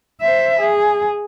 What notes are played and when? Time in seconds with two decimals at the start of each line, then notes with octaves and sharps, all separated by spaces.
0.22 C5 E5
0.60 G#4